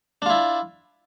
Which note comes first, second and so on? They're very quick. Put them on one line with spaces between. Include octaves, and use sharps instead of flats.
D4 F4 E4